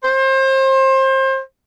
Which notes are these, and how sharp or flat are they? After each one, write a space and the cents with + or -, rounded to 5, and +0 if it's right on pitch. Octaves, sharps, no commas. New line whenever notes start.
C5 +30